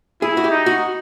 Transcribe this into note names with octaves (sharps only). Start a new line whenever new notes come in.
E4 G#4
F#4
G4
D#4
F#4